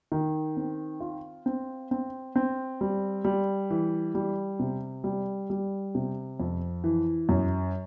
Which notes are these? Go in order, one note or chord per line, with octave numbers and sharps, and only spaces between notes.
D#3
C4
F4
C4
C4
C4
G3
G3
E3
G3
C3
G3
G3
C3
F2
E3
F#2